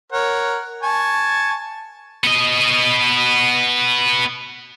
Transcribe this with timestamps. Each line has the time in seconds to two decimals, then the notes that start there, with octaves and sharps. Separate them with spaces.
0.12 A#4 C#5 F#5
0.83 G#5 A5 C#6
2.24 B3 D#5